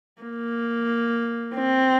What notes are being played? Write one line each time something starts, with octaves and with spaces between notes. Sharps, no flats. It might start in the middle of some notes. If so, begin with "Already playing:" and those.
A#3
C4